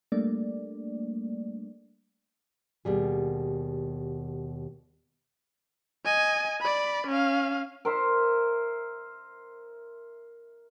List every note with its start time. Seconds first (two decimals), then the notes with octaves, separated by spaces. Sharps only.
0.12 G3 A3 A#3 D4 D5
2.85 D#2 B2 G3 G#4
6.05 D#5 G#5
6.61 D5 B5
7.07 C#4 F5
7.85 A#4 C5 E5